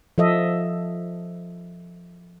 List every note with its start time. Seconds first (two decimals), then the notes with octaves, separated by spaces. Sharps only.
0.18 F3 A4 D#5 E5